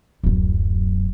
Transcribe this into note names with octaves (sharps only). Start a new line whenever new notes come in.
D1 F#2